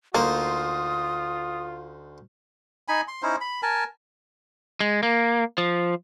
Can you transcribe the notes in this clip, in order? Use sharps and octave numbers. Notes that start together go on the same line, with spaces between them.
D2 A#3 D#4 F4 C5 D#6
D#4 G#5 B5
C6
C#4 D#4 E4 C5
B5
A#4 G#5 A5
G#3
A#3
F3